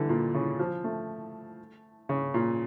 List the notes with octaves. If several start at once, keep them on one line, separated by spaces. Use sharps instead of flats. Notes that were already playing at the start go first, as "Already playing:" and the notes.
Already playing: D3 E3 G3
A#2
C#3
F3
A3
C#3
A#2